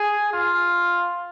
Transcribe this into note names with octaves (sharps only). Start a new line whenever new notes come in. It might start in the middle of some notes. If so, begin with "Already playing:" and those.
Already playing: G#4
F4